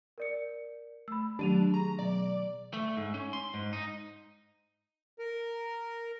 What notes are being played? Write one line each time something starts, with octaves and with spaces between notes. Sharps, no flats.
A#4 D5 C#7
A3 B5 E6
D#3 F#3 A3 D4 G4 D#7 F7
G#4 A#5
B2 F#3 B3 D5
A3
G#2
C#4
C6
G#2
D#4
A#4